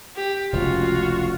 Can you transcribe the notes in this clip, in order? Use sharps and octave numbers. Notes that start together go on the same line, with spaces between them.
G4
F1 C#2 F4 F#4